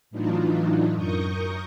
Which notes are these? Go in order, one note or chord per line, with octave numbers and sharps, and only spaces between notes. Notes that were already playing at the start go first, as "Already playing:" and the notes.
A2 E3 F#3 D4 D#4 F4
F#2 A#4 A#5 C#6 D#6 G6